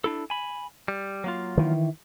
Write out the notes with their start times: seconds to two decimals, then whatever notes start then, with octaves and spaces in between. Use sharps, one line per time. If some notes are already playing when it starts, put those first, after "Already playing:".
0.04 D4 E4 A4
0.30 G#5 B5
0.88 G3
1.24 F#3 A#3 F4
1.58 D#3 E3